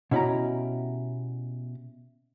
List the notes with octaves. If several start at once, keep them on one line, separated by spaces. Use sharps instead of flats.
B2 C#4 E4 G4 A#5